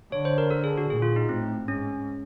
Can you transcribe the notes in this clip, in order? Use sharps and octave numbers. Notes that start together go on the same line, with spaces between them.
D3 C#5
C5
A#4
A4
G#4
F#4
A#2 G#4
F4
D#4
A2 C4
G#2 C#4